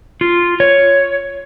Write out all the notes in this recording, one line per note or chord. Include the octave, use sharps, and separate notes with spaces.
F4
C#5